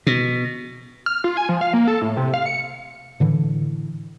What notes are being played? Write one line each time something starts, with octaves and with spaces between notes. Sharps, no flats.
B2
F6
F4
G#5
F3
F5
A#3
A4
A2
C3
F5
C#7
A2 D3 E3